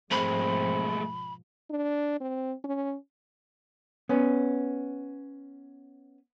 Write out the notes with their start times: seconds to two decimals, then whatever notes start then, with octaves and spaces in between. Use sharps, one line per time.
0.11 G#2 B2 F3 G#3 A3 C4 B5
1.70 D4
2.21 C4
2.64 C#4
4.09 B3 C#4